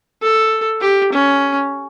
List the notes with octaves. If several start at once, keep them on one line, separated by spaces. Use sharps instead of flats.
A4
G4
C#4